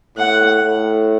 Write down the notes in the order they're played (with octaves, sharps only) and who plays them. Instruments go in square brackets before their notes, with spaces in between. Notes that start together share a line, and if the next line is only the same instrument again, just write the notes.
[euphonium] A2 [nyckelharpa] F#5
[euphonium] A2